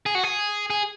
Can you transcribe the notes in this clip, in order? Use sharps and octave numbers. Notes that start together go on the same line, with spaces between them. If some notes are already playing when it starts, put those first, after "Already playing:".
G#4
F#4
G#4
G#4